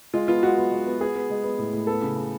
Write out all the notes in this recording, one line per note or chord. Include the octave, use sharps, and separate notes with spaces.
G#3 F4
B3 F4
G#3 F#4
B3
G#3
B3
B3 G#4
B3
G#3
B3
A2
A2
B3 A4
C#3
C#3